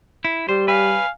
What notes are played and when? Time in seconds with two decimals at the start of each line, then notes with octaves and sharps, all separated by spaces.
0.25 E4
0.49 G3 C5
0.68 B4 F5 G#5